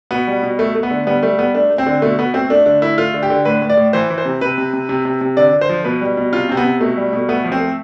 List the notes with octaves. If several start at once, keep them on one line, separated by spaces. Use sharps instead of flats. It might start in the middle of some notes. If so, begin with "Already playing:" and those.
B2 B3
G3
B2
A3
A3
B3
D3
G3 B3
G3 A3
G3 B3
A3 D4
A3
C4
D3
B2 A3
B2 B3
A3 C4
A3 D4
D3 D4
A3 E4
A3 F4
D3
G4
D3
A2 B4
A2
D5
A2
E3 C5
E3
C5
C3
C3 B4
C3
C3
C3
C3
C3
D3 D5
D3
C5
F3
B2 B4
G3
B2
C3 F4
C3 C4
B3
C3
B2 A3
G3
B2
A3 B3
F3
C4
A3